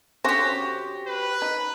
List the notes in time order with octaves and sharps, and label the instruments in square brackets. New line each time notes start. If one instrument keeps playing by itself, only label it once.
[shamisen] D3 C#4 C5 [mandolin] F#4 G4
[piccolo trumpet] B4
[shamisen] D#4